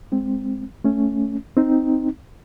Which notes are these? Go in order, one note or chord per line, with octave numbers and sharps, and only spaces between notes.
G#3 C4
A3 C#4
C4 D#4